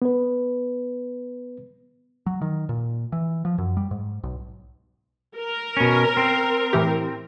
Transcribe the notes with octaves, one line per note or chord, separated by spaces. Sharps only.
B3 B4
F#3
D#3
A#2
E3
F3
F#2
G3
G#2
B1
A#4
B2 C#4
C4
A2 E3 G4